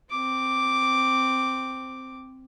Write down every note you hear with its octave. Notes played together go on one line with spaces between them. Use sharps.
C4 D6